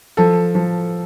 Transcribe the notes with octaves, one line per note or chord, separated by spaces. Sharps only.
F3 A4
F3